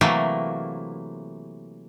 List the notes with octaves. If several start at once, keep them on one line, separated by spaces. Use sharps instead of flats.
C3 E3 F#3 A3 A#3